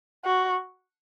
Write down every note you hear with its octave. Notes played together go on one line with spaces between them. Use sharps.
F#4